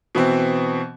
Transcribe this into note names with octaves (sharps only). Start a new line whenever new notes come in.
B2 E3 C4